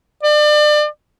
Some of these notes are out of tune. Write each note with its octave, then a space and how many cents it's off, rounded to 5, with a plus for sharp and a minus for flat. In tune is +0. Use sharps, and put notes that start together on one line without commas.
D5 +35